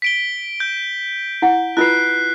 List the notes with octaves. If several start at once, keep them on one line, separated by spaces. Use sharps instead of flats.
B6 D7 G7
G6
E4 F#5
E4 F4 B4 F#6 C7